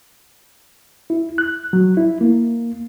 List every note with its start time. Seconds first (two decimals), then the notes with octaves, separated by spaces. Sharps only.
1.10 E4
1.38 F#6
1.73 F#3
1.97 E4
2.21 A#3